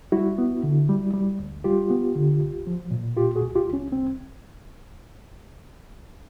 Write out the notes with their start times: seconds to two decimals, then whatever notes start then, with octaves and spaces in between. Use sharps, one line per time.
0.12 G3 E4 F#4
0.38 B3
0.63 D3
0.89 G3
1.14 G3
1.40 D2
1.64 G3 F4 G4
1.90 B3
2.16 D3
2.41 C2
2.67 F3
2.91 A#2
3.16 A#2 F4 G4
3.36 F#4 G#4
3.42 C2
3.55 F4 G4
3.67 C2
3.73 C#4
3.92 C2 C4